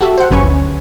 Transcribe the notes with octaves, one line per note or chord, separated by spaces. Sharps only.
F#4 G4 A4 E5
C5 F#5
G1 F#2 C#4 B4 G#5 C#6
D2